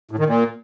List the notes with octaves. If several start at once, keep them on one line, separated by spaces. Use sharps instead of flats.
A2
D#3
A#2